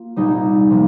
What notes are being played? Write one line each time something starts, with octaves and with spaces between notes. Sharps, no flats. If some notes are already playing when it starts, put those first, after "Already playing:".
Already playing: A#3 F4
C2 A#2 G3 D#4
C3 F3 A#3